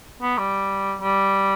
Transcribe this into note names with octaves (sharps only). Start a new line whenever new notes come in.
B3
G3
G3